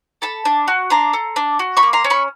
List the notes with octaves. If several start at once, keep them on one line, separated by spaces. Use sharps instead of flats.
A4 A5 B5
D4
F#4
D4 A#5 C6
A4
D4
F#4
B5 C#6
A#3
A#5 C6
C#4
B5 C#6